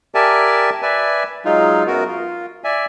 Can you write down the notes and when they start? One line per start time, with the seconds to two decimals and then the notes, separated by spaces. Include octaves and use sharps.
0.15 G4 A#4 D5 E5 G#5 A5
0.82 B4 D5 E5 G#5
1.45 F#3 G#3 D#4 F4
1.87 F#2 B3 F#4 A#4
2.08 F4
2.64 D5 E5 G#5